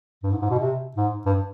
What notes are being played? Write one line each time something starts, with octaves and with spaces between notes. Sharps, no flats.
G2
G#2
G#2
B2
C3
G#2
G2